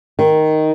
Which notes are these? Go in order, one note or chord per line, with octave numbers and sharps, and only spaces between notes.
D#3